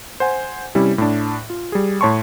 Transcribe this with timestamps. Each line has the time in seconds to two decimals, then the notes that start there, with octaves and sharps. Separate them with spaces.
0.20 C5 F#5 G#5
0.75 C3 G3 C#4 E4
0.98 A2 D4
1.50 F4
1.72 G3 G#4
2.01 A2 C#5 A5 C6 C#6